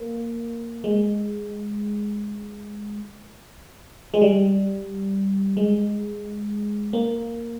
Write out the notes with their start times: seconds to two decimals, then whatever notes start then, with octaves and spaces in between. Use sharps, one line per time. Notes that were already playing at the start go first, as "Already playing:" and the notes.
Already playing: A#3
0.84 G#3
4.14 G#3
4.21 G3
5.57 G#3
6.93 A#3